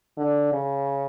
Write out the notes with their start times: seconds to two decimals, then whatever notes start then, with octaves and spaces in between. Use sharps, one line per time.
0.17 D3
0.52 C#3